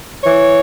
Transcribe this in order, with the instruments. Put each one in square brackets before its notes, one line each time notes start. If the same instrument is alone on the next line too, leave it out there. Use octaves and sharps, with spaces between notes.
[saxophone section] E3 C#5